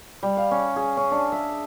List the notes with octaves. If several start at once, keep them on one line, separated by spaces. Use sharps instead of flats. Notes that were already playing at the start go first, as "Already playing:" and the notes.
G3
F5
C#4
G#4
C#4
D4
E5